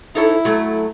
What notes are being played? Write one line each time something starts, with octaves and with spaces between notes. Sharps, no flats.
D#4 E4 A4 C#5
F#3 A3